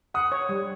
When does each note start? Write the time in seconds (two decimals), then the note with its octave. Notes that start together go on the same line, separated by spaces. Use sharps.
0.14 F#5 D#6
0.32 C#5
0.49 G3